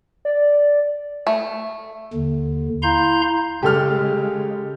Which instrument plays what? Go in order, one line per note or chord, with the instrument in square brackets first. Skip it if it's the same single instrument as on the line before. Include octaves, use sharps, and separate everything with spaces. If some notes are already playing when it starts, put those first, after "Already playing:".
[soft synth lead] D5
[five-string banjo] A3
[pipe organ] D#2 D3
E4 F5 A#5 C6 G6
[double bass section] C#3 G#3 [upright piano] G4 A4 F6